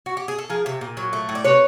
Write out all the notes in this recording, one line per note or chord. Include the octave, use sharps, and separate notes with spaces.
F#4
G4
G#4
A4
F3 G#4 A#4
C3
A#2
F#3
A3
A2
D5
C3 B4 C#5